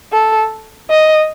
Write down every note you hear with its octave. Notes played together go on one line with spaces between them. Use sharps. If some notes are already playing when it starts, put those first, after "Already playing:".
A4
D#5